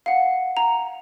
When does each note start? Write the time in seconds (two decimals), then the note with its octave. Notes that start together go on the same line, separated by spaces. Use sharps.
0.06 F5 F#5
0.57 A#5